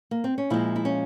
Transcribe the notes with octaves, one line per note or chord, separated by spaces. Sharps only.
A#3
C4
C#4
A#2 F3 G#3 E4
E4
C#4